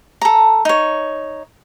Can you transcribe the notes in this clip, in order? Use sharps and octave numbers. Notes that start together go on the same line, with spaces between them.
A4 A#5
D#4 C#5